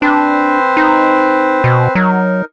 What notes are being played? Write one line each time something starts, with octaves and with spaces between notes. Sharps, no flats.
C4 D4 B4 C5
D#4
B2
F#3 D#4 A#4